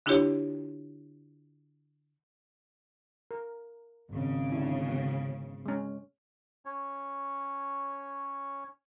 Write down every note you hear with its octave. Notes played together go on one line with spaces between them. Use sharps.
D3 D4 E4 F4 G4 C#5
A#4
G#1 C#3
D3 E4
B3
G#3 C#4
C#4 C#5